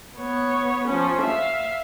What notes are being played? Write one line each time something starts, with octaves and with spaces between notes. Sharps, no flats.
B3 C#5
F3 C#4
E5 F5